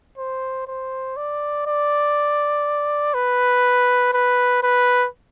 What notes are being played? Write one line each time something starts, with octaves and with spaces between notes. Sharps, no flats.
C5
C5
D5
D5
B4
B4
B4